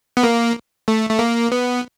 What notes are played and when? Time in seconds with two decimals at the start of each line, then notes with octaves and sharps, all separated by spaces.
0.17 B3
0.23 A#3
0.88 A3
1.10 A3
1.19 A#3
1.52 B3